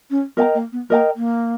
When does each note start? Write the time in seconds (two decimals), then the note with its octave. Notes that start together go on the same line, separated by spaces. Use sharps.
0.11 C#4
0.37 B3 A#4 D#5 G5 A#5
0.55 A#3
0.72 B3
0.90 A#3 A#4 D#5 G5 A#5
1.16 A#3